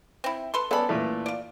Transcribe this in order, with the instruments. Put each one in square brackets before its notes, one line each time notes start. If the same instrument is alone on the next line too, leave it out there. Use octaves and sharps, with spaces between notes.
[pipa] C4 E4
A4 B4 C6
[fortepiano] B3 A4 D5 [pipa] C#4 B5
[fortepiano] A#2 E3 A3
[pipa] F4 D5